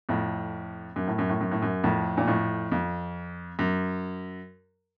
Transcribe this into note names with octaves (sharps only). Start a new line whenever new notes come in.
F2 A2
F#2
A2
F#2
A2
F#2
A2
F#2
F2 A2
A#2
F2 A2
F2
F#2